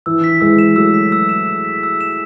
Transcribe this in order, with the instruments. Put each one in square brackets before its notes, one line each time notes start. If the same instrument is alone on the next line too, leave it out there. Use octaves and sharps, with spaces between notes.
[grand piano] E3 [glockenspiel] E6
[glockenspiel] B6
[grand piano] E3 G#3 [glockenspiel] E6
[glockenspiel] E7
[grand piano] F#3 A3 [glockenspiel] E6
[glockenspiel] B6
E6
E7
E6
B6
E6
E7